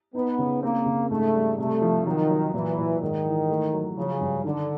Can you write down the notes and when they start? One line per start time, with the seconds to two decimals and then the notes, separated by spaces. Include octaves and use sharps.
0.15 B3 D#4
0.38 C#3
0.62 A#3 C4
0.86 C#3
1.10 G#2 A3
1.34 G3
1.58 C3 A3
1.82 F3
2.06 D#3 F#3
2.30 F#3
2.53 A#2 E3
2.78 A#2
3.01 G#2 D#3
3.25 E3
3.49 A3
3.73 F#3
3.97 C#3 F3
4.21 G2
4.44 D3 D#3